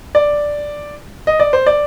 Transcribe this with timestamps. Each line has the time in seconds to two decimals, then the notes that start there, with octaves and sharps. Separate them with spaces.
0.15 D5
1.27 D#5
1.40 D5
1.53 C5
1.66 D5